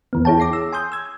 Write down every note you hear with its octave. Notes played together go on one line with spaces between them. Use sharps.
E2 E3 B3
E4 G#4 C#5 G5 A5
D6 A#6 C7
E6
G#5 C6 D#6 G6
E6 G#6